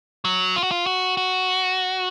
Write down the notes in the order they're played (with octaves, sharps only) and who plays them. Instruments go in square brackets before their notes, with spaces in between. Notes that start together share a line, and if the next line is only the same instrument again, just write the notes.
[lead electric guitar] F#3
F4
F#4
F4
F#4
F#4